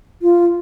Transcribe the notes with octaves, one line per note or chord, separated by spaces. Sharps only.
F4